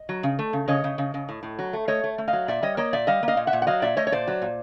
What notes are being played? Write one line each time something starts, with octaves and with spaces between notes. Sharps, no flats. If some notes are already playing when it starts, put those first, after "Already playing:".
Already playing: D#5
F#3
C#3
A3
C#3
C#3 C#5 D#5
C#3
C#3
C#3
A2
A2
F#3
A3
A3 C#5 D#5
A3
A3
D#5 F5
F#3
A#2 D5 E5
G3 C#5 D#5
A#3 C#5 D#5
A#2 D5 E5
G3 D#5 F5
A#3
D#5 F5
A#2
E5 F#5
A#2
F#5
F#3 D#5 F5
A#2 D5 E5
A3 C#5 D#5
C#5
A#2 C5 D5
F#3
A#2